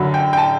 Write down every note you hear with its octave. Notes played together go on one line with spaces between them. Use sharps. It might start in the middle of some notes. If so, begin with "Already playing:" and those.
Already playing: F#2 D3 F#3 B5
G5
G5
A5